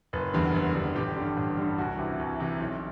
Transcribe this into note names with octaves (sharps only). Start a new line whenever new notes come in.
F#1 B4
E2 D3 G3
F#1
E2 D3 G3
A1 G4
G2 D3 G3
A1
G2 D3 G3
C2 F#4
C3 E3
C2
C3 E3
B1